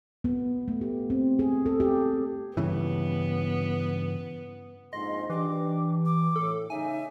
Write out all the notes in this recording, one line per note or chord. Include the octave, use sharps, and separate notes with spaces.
B3
A3
G4
C4
G#4
A4
G4
G2 C#3 E3 B3
A#1 F2 G#2 D#5 C6
E3 D4 G4 D6
D6
A2 A4
C#3 D#4 E5 G#5